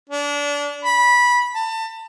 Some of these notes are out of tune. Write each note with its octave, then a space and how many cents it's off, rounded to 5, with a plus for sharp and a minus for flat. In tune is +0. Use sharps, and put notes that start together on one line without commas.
D4 -25
B5 -15
A5 +30